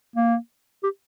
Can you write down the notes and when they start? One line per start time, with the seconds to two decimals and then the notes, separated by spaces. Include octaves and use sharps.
0.16 A#3
0.84 G4